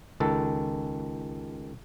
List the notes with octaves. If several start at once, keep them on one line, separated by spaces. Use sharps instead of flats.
C#2 D#3 A4